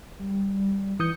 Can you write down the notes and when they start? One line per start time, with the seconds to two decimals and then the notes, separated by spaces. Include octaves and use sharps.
0.19 G3
0.99 E3 D#6 G6 C#7